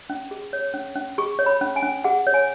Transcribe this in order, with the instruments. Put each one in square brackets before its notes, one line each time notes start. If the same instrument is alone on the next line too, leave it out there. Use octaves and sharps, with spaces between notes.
[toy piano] C#4
G#4
C#5
C#4
C#4
G#4 C#6
C#5
B5
C#4
G#5
C#4
G#4 F#5
C#5
G#5